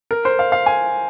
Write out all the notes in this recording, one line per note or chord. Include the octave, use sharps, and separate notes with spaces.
A#4
C5
F5
F5
G#5